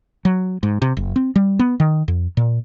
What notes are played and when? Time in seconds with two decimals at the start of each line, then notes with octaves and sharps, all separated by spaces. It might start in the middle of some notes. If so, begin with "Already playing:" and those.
0.25 F#3
0.63 G#2
0.82 C3
0.97 F#1
1.16 C4
1.36 G3
1.59 B3
1.80 D#3
2.08 F2
2.37 A#2